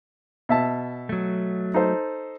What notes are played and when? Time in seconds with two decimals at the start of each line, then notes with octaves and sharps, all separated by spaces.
0.49 B2 E5 A5
1.09 F#3 A3
1.74 D#4 A4 C5